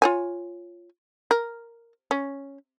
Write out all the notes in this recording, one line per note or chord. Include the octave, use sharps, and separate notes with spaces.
F4 C#5 G#5
A#4
C#4